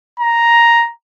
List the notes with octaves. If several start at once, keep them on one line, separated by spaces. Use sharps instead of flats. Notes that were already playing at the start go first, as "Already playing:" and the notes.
A#5